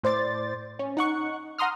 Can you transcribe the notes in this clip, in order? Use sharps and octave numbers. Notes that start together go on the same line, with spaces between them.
A2 C5 D5 A6
C#4
D#4 F#5 C#6
F#5 A#5 C6 D#6 F6